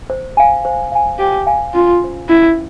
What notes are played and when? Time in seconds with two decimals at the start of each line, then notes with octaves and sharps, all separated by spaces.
0.10 C5
0.37 F5 G#5
0.65 C5
0.92 F5 G#5
1.19 G4 C5
1.47 F5 G#5
1.74 C#4 F4
2.02 F4 C5
2.29 C#4 E4